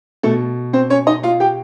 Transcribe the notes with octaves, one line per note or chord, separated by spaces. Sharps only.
B2 A3 A4
C4 C5
C#4 C#5
D#4 D#5
F4 F5
G4 G5